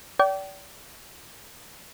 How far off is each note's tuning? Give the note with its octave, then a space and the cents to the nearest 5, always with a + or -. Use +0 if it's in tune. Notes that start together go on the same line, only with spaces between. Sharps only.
D5 -35 G5 -30